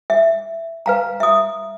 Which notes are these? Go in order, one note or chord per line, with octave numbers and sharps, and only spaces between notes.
E5
B4 F5 A#5
E5 D#6